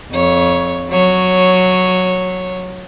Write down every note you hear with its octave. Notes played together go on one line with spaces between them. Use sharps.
F2 C#5
F#3 C#5